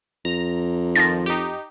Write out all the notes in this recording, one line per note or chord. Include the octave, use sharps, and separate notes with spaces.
F2 A#5
D#3 F3 A6 A#6
D#4 G4